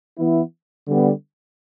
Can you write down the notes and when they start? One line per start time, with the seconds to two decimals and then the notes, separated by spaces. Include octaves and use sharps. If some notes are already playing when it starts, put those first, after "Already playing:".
0.19 E3 B3 E4
0.88 D3 G3 B3